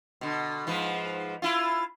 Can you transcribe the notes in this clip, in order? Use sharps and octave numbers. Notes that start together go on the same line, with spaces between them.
B2 D3
G#2 F3 B4
E4 F4